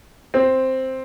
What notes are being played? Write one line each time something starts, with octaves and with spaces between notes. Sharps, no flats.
C4